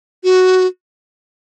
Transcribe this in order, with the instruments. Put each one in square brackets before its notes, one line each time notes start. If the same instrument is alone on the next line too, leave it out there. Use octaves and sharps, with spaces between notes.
[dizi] F#4